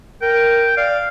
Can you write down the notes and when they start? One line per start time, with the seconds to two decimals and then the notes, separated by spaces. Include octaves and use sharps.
0.22 A#4 G5
0.77 D5 F5